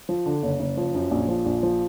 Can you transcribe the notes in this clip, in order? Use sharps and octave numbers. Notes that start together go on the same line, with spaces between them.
F3
D3
F#1
F#1
F3
F#2
A#1
F3
A#1
F3